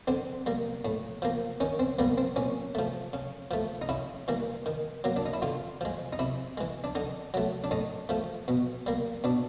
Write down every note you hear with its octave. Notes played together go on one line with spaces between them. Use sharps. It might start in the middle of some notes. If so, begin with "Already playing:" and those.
D3 C4
G3 A#3
A2
F3 A#3
D#3 C#4
C4
G3 A#3 B3
C4
A#2 C#4
F3 A3
C#3
F3 A3
D#4
C#3 E4
E3 G3 A#3
D#3
F#3 A#3
D4
D#4
E4
D3 F4
F3 G#3
D#4
C3 E4
E3 G#3
D4
D3 D#4
F#3 A3
D4
A2 D#4
F3 A3
B2
G3 A#3
B2 D4